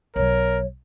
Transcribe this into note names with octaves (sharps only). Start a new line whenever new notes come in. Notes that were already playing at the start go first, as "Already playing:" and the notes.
B1 F#3 A#4 C#5